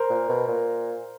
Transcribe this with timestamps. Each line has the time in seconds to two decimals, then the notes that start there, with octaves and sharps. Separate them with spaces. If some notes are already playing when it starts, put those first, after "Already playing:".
Already playing: A#4 C5
0.10 A#2
0.29 B2
0.47 A#2